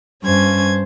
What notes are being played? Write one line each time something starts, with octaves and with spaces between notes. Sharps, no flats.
G2 C#4 C5 G#6